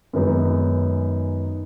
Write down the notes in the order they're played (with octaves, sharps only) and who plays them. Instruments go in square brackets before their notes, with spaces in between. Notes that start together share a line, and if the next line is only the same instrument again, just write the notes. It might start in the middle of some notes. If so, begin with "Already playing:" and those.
[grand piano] F#2 D#3 G#3 B3 D#4